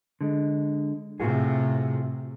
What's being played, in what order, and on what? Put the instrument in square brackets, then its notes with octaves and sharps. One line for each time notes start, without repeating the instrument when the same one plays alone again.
[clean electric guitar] D3 G#3
[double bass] A2 C3 [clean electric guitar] F4 F#4 G#4